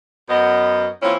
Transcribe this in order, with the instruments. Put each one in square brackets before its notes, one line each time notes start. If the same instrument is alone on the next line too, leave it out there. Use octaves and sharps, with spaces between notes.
[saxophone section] F#2 B3 D#5
E3 A#3 C4 C#4 E4 F4